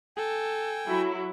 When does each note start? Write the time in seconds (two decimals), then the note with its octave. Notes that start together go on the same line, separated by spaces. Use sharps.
0.17 A4 G5 G#5
0.86 F#3 E4